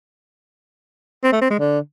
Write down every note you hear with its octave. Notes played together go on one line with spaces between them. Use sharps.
C4
A3
C4
G#3
D3